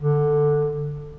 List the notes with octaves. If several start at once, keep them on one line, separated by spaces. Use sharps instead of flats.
D3